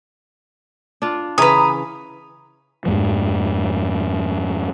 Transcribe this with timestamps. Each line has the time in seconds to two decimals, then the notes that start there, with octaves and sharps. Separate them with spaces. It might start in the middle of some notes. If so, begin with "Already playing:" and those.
1.02 D4 F4
1.38 C#3 E3 C#4 B4 A#5 D#6
2.86 F2 G#2 F3